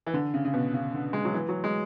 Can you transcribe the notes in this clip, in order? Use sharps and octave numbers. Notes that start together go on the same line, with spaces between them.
E3
D3
C#3
C#3
B2
C#3
D3
G#3
F#3
E3
F#3
G#3